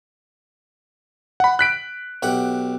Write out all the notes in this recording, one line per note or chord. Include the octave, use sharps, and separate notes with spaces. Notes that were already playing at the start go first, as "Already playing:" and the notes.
F#5 B5
F#6 B6 D7
B1 G4 F#5